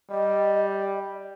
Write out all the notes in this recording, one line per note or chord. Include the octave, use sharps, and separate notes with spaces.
G3 D#5